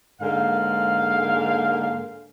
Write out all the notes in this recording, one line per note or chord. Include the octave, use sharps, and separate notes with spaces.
G#2 D3 A#3 F5